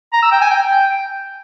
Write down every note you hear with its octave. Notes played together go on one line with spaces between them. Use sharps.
A#5
E6
G5
G#5
G5